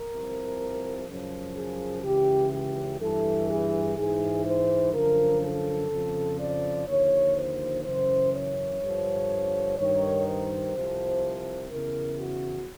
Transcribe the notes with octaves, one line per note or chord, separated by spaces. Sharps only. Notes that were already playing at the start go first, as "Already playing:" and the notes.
Already playing: A#4
C2 C3 F3
F#2 C#3 F3
G#4
C#2 C#3 E3 G4
G4
G2 E3 A4
G#4
G#2 E3 G#4
C5
F#2 D3 F3 A#4
A4
F2 C#3 F3
D5
D#2 D3 F3 C#5
C5
F#2 C#3 E3 C5
C#5
G2 D3 F3
G2 D#3 C#5
C5
C2 C3 F3
E2 C#3 E3 A#4
F#4